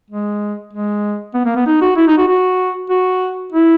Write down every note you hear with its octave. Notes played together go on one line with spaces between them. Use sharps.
G#3
G#3
B3
A#3
B3
D#4
F#4
E4
D#4
F#4
F#4
F#4
E4